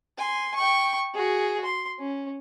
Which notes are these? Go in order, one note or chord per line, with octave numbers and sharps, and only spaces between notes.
G#5 C6
G5 C#6
F#4 G#4
C6
C#4